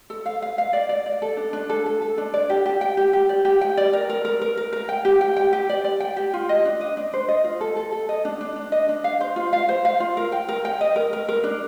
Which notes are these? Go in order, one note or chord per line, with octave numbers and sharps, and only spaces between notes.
A4
F5
F5
F5
D5
D5
D5
A4
D4
D4
A4
A4
A4
D4
D5
G4
G4
G5
G4
G4
D5
G4
G5
D5
A#4
A#4
A#4
A#4
A#4
A#4
G5
G4
G5
G5
G4
D5
D5
G5
G4
F4
D#5
D4
D#5
D4
C5
D#5
F4
A4
A4
A4
D#5
D4
D4
D4
D#5
D4
F5
C5
F4
F5
C5
F5
F4
A#4
G5
A#4
G5
D#5
A#4
A#4
A#4
D4